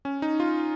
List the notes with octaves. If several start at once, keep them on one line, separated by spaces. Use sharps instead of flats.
C#4
D#4
F4